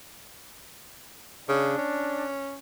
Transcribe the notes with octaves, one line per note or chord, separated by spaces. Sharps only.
C#3 D4
C#4